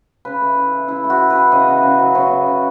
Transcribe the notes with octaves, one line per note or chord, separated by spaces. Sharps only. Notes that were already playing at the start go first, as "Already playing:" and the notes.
C#3 B4
A3
E4
E3
C#3 E4
A3
F#4
E4
B4
E3
C#3 D#5
B3
C#3
F#3
C#3 C#5
B3
C#3